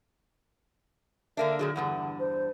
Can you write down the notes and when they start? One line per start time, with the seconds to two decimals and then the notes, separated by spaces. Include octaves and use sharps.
1.37 D3 A#3 D4 E5
1.59 A#2 D3 F#3 G#4
1.76 E2 G2 D3 F#5
2.19 C5